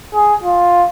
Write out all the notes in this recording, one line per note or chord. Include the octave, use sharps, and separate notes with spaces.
G#4
F4